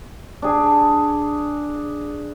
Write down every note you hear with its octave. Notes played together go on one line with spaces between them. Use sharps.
D4 G#4